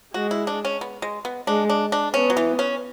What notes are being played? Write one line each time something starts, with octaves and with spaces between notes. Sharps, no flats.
G#3 F#4
E4
D4
C#4
B3
G#3
B3
G#3 D4
D4
D4
B3 C#4
F#3
E3
C#4